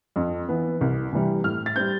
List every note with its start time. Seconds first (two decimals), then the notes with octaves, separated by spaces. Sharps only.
0.16 F2
0.49 E3 B3
0.81 C2
1.12 C3 E3 G3
1.44 A2 F6
1.66 A6
1.76 G3 C4 G6